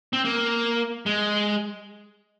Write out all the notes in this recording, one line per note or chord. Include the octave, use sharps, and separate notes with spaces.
C4
A#3
G#3